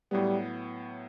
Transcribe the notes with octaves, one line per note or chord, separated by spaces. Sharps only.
A2 F#3 G3 B3